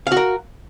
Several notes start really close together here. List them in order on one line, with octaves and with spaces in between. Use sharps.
F5 F#4 A#4